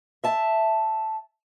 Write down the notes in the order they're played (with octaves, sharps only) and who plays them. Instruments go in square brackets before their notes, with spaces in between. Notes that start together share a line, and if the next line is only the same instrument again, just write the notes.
[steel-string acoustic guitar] E5 A5